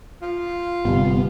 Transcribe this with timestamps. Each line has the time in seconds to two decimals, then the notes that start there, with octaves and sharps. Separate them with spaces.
0.22 F4
0.85 G1 C3 G3 B3